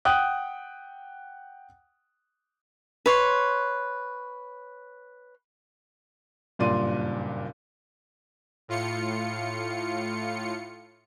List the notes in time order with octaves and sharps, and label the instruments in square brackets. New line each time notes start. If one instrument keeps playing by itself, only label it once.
[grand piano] F#5 G5 D#6 F#6
[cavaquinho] B4 C#5 C6
[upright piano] F#1 G2 A#2 D5 C6 D#7
[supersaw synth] A2 F4 C#7